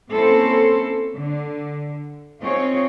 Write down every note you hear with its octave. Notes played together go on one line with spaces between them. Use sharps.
A#3 C4 C#4 E4 A4 C5
D3
C4 D#4 F4 G#4 C#5